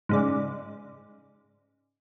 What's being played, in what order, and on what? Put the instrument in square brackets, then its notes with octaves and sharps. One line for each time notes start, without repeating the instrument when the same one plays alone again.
[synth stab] G#2 C#3 D5